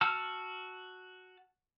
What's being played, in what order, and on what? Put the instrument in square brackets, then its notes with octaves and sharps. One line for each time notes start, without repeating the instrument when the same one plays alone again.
[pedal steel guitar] F#4 A5 E6 F6